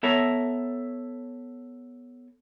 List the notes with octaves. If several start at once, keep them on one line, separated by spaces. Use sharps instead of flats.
B3 A4 C#5 E5 A#5